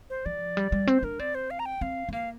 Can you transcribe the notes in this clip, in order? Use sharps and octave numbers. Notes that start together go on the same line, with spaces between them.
C5
F3 D5
G3
G3
C4 C5
D4 A#4
C4 D5
C5
F5
A#5
G5
C4 F5
C4
A#3 F5